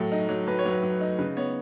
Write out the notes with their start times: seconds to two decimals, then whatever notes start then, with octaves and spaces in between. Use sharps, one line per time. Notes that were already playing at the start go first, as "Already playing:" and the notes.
Already playing: A2 F#3 A4
0.12 D#4
0.29 F#3
0.47 F#3 B4
0.59 C#5
0.65 F#3
0.71 B4
0.83 F#3
1.01 D#4
1.19 C#3 B4
1.37 B3 C#5